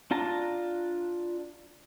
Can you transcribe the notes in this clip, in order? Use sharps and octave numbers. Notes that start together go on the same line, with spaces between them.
D4 F4 A5 A#5